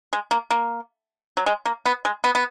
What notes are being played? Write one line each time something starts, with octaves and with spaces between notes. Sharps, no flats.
G#3
A#3
A#3
F#3
G#3
A#3
B3
G#3
B3
B3